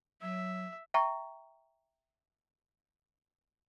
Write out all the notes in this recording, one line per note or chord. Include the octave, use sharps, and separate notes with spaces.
F#3 E5
E5 G5 A#5 C#6